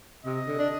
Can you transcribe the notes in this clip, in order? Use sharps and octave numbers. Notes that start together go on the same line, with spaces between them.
C3 D#5
D3
D4